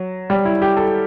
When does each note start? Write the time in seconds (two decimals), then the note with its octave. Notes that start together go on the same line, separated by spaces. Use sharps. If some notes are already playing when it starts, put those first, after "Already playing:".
Already playing: F#3
0.30 G3
0.45 E4
0.62 G4
0.77 A4